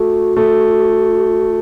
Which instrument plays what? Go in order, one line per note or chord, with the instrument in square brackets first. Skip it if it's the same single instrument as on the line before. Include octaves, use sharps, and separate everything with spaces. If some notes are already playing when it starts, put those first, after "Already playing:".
Already playing: [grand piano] A3 [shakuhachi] F#4
[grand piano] A3